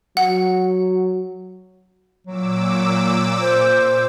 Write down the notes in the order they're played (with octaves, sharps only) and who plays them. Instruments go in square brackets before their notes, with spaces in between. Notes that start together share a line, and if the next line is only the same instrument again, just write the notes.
[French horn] F#3 [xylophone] F#5
[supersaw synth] A#2 D6 E6 [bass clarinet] F#3
[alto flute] C5